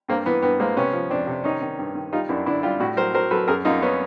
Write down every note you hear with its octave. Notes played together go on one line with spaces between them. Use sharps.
G2 A#3 C4
E3 B3
G2 B3
G#3 A#3 C4
C3 B3 C#4
F3
F2 C4 D4
C3
D#3 C#4 D#4
D#3
G2
D#3
G3 D#4 F4
F#2 D4 E4
D3 D4 E4
G3 F4 G4
A2 E4 F#4
F#3 A#4 C5
F#3 A#4 C5
F#3 A4 B4
F#2 G#4 A#4
F#2 D#4 F4
B3 C#4